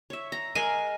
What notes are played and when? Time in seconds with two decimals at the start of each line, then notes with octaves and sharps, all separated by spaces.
0.10 C#5 E5
0.32 A#5
0.55 G#3 G#4 A#4 G#5